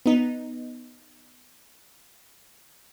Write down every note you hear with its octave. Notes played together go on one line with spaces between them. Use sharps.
B3 D#4